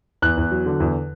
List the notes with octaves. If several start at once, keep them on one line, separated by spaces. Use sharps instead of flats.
E2 F#6
E2
F#3
D3
E2